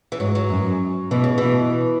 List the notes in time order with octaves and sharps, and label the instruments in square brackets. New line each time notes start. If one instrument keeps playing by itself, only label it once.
[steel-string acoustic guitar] E3
[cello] G#2 [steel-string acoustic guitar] F#3
[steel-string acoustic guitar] F#3
[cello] F#2
[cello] B2 [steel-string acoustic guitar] E3
[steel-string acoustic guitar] C#3
[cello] B2 [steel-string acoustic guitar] E3